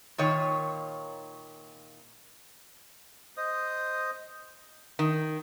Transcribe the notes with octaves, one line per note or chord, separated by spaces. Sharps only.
A#2 D#3 C#5
C5 D#5 D#6
D#3